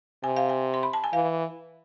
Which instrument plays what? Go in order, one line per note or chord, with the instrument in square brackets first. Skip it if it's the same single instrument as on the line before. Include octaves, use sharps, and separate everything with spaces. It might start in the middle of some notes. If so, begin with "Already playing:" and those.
[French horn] C3 [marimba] G#5
[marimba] F5
G#5
C6
B5
A5
G#5
[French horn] E3 [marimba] F5